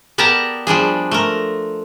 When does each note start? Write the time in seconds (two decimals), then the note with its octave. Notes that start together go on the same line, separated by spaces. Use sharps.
0.18 B3 G4 A#4 D5 A5 A#5
0.67 F3 G3 D4 G#4
1.11 A3 A#4